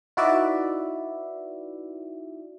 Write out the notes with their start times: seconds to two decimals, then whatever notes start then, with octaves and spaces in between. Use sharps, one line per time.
0.17 D#4 E4 F#4 B4 D5 E5